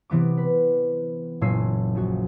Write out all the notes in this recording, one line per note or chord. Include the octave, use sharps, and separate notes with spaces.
C3 E3 B3 D6
B4
F#1 A#2 C#4 E6 C7
A#1 F#4